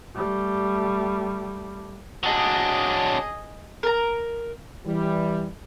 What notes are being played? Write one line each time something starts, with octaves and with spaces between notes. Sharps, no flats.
G3 A3
F#3 D4 G#4 D#5
A#4 A#5
E3 G3